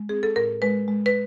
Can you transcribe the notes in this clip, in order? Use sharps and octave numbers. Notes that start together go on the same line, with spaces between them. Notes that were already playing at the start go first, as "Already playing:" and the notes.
Already playing: G#3
C4 G#4
A4
A2 A#4
G#3 B4
G#3
B4